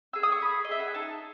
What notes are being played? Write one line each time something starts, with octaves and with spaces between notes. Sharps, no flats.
G#4 E6
D#6
C#6
G#4 B5
D#5
G#4 E5
F#5
G#5
D#4 A5